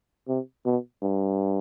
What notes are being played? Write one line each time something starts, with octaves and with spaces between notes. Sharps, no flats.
C3
B2
G2